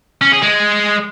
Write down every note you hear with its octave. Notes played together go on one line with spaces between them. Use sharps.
C#4
G#4
G#3